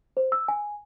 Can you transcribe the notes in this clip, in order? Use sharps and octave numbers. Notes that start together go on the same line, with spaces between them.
C5
E6
G#5